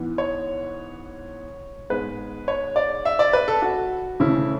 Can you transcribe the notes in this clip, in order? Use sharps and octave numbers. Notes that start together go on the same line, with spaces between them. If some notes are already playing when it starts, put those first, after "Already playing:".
Already playing: G#2 E3 B3
C#5
G#2 G#3 B3 B4
C#5
D5
E5
D5
B4
A4
F#4
D2 C#3 E3 A3 C#4 E4